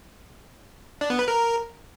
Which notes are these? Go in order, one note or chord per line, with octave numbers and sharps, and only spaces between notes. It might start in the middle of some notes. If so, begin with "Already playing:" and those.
D4
B3
B4
A#4